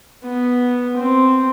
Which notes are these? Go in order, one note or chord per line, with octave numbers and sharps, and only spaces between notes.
B3
C4